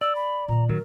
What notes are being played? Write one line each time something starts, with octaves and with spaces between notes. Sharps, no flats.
D5 E6
B5
A#2 D#3 A#5
D#3 F#3 A3 A#4